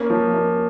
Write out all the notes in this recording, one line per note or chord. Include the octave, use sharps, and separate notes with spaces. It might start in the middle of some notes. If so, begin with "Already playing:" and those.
Already playing: A#3 C#4
F3
A#3